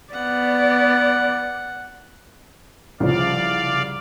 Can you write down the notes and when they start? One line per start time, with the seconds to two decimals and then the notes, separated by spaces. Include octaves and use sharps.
0.13 B3 D5 F#5
3.00 C2 C#3 F3 D5 F5